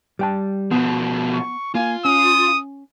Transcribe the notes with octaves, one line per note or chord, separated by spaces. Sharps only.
G3 G5 A5
B2 F3 B3
C#6
A#3 F4 G#5
C#4 D#6